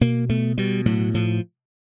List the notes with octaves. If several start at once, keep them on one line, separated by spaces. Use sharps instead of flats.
B2 A#3
B2 A3
B2 G3
A2 F#3
A2 F3